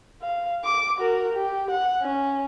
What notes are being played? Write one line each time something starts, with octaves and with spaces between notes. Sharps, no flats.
F5
D6
F#4 A#4
G4
F#5
C#4